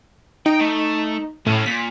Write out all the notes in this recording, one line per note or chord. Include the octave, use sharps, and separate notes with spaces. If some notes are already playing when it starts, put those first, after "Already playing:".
D#4 G5
A3
A2 C#4 A4
A#2 B6